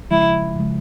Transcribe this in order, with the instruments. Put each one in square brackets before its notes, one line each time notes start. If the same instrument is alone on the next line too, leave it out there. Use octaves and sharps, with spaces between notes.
[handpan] C#3 F3 G#3 [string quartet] E4
[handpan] C#3 F3 G#3